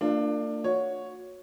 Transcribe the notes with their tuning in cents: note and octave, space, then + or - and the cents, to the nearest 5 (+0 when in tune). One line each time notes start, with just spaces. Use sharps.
A#3 -40 D4 +20 F4 +0
F#4 -25 C#5 +0